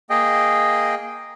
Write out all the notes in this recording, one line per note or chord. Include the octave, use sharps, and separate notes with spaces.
A#3 G#4 D#5 G5